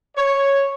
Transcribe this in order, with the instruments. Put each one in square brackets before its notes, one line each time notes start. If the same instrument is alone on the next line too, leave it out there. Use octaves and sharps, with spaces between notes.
[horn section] C#5